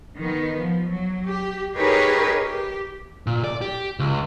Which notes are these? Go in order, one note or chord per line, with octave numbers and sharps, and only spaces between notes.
D#3 B3
F3
F#3
G4
D#4 G4 G#4 A#4 B4 C#5
G4
A#2
D5
G4
C#2